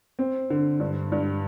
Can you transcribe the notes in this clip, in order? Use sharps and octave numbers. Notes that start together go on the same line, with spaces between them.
C4
D3
G2
G2